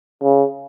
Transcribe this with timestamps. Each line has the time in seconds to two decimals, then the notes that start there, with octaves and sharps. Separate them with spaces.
0.22 C#3